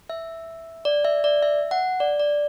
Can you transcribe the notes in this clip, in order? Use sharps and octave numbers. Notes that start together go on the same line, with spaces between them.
E5
D5
E5
D5
E5
F#5
D5
D5